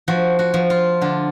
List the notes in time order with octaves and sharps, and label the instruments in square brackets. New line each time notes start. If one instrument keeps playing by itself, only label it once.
[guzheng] F3 F#4
F#4
F3
F4
D3 D4